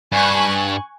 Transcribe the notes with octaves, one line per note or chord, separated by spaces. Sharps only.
G2 G#5 C#6 F#6